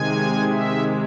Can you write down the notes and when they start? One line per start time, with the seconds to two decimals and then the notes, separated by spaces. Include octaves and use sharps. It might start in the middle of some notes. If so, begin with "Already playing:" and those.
Already playing: C3 D#3 G#3 G#5
0.51 E5